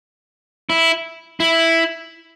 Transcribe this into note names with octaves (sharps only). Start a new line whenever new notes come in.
E4
E4